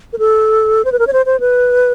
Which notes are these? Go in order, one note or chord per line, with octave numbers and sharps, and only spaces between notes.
A#4
A4
C5
B4
A#4
C#5
C5
C5
B4